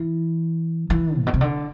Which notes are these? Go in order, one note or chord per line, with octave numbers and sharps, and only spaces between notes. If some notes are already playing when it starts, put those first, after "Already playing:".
Already playing: E3
E3
A2
B2
C3
D3